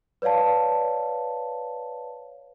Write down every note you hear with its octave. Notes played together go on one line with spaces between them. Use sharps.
B4 C#5 D5 F5 A5